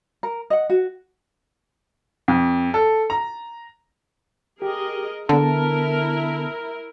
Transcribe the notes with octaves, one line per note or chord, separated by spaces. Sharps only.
A#4
D#5 F#5
F#4
F2
A4
A#5
G4 G#4 A#4 D#5
D3 B3 E4 A#4 A5